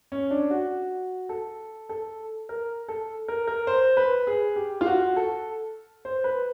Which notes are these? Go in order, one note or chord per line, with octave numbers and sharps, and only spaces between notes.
C#4
D4
F#4
A4
A4
A#4
A4
A#4
A#4
C5
B4
G#4
G4
F4
F#4
A4
C5
B4